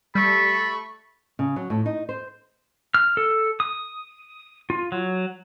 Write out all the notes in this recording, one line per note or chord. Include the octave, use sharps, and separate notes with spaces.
G3 A3 A4 B5 C#6
C#3
F#3
A2
D#4
C5
F6
A4
D#6
F4
F#3